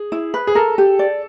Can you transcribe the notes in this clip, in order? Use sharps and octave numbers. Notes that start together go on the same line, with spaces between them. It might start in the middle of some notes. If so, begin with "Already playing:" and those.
Already playing: G#4
E4
B4
G#4
A4 A#4
G4
D5